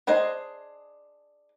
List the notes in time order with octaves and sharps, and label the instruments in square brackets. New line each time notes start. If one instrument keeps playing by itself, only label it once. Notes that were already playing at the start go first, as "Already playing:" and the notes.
[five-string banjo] D4 G#4 C5 D#5